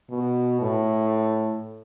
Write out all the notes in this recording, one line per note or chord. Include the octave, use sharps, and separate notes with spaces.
B2
A2